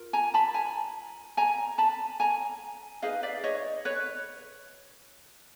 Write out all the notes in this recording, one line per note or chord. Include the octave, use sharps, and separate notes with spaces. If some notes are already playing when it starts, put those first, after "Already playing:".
Already playing: F4 A#4
G#5 A#5
A5 B5
G#5 A#5
G#5 A#5
A5 B5
G#5 A#5
D#4 G#4 B4 D#5 F5
D5 E5
C#5 D#5
B4 C#5